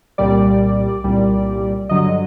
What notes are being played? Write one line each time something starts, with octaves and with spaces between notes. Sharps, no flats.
C2 A#2 G3 D5
C2 A#2 G3
G2 D3 F#3 D#5